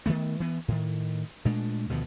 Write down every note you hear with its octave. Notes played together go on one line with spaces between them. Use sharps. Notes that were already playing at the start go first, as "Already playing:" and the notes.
D#3 E3 A3 B3
E3 B3
A2 D#3
A#2 G#3 A3 D4
D2 B2 D#3 F3